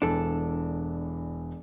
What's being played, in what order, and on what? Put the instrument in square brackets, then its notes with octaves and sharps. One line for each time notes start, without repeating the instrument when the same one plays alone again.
[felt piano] E1 E3 [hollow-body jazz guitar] D4 A4